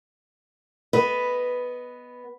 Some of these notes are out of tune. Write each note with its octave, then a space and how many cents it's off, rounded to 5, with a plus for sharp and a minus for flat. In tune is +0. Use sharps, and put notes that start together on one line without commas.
B3 +0 B4 +0 D#5 +0